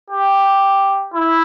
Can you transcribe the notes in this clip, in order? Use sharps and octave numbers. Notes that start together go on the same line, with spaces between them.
G4
E4